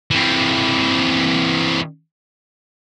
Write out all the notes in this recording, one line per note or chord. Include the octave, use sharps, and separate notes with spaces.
E3 C4